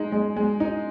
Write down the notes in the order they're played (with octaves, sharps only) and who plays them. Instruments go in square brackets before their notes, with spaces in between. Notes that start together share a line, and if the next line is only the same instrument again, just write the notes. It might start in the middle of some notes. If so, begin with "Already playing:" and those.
Already playing: [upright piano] G#3 D#4
G#3
G#3
D#4